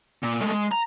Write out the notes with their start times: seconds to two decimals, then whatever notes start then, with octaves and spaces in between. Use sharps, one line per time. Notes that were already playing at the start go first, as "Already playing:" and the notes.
0.23 A#2
0.41 G#3 A3
0.52 G#3
0.72 A#5